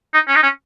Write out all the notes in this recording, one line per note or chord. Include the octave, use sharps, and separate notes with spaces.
D#4
C#4
D#4
C#4